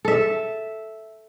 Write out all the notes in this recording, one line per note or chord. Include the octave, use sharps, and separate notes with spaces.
A4 E5